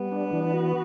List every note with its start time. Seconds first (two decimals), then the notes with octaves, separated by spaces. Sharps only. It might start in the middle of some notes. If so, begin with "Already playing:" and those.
Already playing: G3 B3
0.12 D4
0.33 E3
0.54 F#4